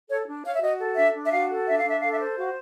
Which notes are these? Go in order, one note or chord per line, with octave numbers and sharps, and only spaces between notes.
A4 C#5
D4
C#5 F5
E5
F#4 D#5
A4
D4 E5
D4
E5
F#4 F5
A4
D4 E5
F5
D4
E5
A4 F5
E5
C5
F#4 F5